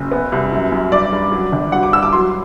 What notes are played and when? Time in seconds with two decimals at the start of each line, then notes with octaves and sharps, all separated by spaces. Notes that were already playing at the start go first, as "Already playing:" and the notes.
Already playing: F#1
0.11 B3
0.32 C2
0.52 F#2
0.72 F#2
0.92 G2 D5
1.12 G2
1.32 F#3
1.52 G1
1.72 G2 F#5
1.83 D6
1.93 G2 E6
2.03 D6
2.13 F#3 C6